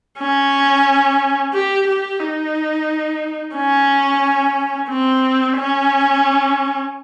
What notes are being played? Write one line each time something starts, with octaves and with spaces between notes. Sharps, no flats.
C#4
G4
G4
D#4
C#4
C4
C#4